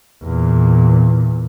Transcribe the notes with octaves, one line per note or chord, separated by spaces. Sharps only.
E2 A#2